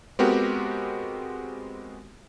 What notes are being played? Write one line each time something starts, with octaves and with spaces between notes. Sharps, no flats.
G#3 B3 C4 F#4 G4 A#4